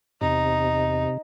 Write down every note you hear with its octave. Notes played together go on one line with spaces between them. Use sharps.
E2 C3 D#4